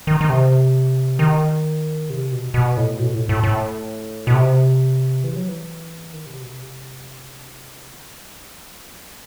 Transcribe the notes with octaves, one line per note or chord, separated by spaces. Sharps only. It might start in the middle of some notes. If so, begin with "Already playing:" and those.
D#3
D#3
C3
D#3
C3
B2
B2
A2
B2
A2
A2
A2
B2
C3
E3
F#3
E3
D#3
C3
B2
C3
D#3
F#3
G3
F#3